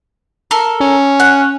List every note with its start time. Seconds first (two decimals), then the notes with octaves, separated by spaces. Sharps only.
0.51 A4 A#4
0.80 C#4
1.20 F#5